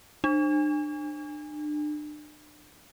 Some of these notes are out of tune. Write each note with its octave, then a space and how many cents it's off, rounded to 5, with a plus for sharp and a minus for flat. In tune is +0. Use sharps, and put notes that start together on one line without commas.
D4 +35